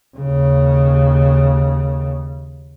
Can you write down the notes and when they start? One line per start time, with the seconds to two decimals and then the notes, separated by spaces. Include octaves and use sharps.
0.18 D#2 C#3